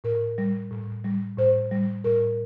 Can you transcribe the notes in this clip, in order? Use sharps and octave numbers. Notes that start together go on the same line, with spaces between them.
A2 A#4
G3
A2
G3
A2 C5
G3
A2 A#4